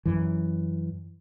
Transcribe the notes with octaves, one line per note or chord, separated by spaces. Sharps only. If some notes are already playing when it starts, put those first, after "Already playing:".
F#2 E3